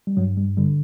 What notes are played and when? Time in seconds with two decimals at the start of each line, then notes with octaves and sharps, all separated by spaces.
0.07 G3
0.17 G2 F#3
0.37 G3
0.57 D3 G3